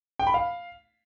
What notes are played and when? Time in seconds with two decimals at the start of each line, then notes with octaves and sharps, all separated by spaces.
0.19 G5
0.27 B5
0.34 F5